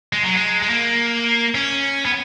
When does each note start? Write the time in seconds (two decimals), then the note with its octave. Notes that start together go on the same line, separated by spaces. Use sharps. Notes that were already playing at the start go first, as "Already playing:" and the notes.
0.13 G#3
0.23 F#3
0.35 G#3
0.62 G#3
0.70 A#3
1.55 C#4
2.05 B3